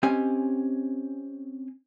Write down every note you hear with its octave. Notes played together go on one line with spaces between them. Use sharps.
C4 C#4 G4 D#5 G#5